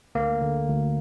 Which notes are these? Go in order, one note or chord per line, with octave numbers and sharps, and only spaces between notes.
D2 A#3
D3
D2